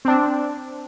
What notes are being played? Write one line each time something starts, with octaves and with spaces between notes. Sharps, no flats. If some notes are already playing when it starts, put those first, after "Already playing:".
C4 D4